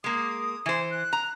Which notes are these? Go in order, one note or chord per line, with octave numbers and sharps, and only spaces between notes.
G#3 A#3 D#6
E3 C5 G#5
F#6
A#5